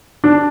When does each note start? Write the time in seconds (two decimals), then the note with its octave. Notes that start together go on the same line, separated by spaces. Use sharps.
0.24 D4